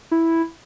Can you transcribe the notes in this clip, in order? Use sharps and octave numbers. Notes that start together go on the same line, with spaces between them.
E4